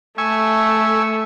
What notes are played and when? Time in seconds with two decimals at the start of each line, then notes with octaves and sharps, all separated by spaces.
0.18 A3 E5 G#5 C#6